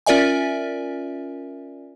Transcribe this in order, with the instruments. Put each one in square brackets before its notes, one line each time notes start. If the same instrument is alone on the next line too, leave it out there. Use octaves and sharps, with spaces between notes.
[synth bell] C#4 F4 A#4 D5 E5 G#5